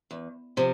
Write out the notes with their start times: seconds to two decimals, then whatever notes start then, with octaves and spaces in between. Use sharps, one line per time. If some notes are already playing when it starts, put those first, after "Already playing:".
0.11 E2
0.57 C3 F3